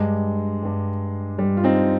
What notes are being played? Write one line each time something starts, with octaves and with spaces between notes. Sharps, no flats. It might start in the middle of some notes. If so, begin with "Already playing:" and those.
Already playing: G2 G3 G#3
G2 G3
G2 G3
F4
C4 D#4